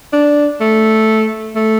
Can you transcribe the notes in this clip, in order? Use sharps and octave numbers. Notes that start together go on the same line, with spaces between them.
D4
A3
A3